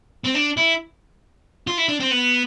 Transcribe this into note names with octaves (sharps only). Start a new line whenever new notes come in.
C4
D4
E4
F4
E4
D4
C4
B3